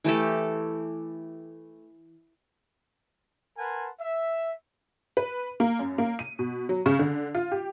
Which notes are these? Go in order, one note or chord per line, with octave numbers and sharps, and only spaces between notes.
E3 A3 G4 A4
A#4 B4 F#5 G#5 A5 C6
E5
B4
A#3
F#2
A#3
D#7
B2
F#3
C#3
D3
F4
G4